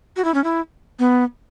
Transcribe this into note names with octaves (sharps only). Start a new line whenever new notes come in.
F#4
E4
C#4
E4
B3